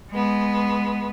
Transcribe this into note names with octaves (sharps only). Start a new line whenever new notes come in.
G#3 B3